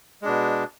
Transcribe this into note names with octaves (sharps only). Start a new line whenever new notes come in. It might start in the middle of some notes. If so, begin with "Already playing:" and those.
B2 G#3 D4